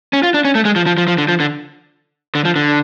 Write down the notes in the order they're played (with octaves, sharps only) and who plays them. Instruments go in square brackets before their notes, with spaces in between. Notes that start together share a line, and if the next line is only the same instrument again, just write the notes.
[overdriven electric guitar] C#4
F4
D4
C#4
A3
G#3
F3
F3
F3
F3
D3
F3
D3
D3
F3
D3